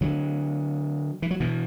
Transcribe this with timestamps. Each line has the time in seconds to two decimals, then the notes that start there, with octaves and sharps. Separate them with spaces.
0.01 D3 F#3
1.22 E3
1.31 F#3
1.40 B2 E3